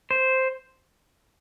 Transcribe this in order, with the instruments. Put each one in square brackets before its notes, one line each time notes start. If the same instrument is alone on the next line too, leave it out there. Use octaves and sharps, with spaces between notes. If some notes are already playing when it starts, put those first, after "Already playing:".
[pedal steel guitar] C5